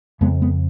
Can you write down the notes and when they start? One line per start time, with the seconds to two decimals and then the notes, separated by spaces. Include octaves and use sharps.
0.21 F2 C#3 G#3 B3
0.41 G#3 B3